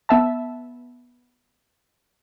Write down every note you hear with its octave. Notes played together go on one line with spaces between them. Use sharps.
B3 E5 A5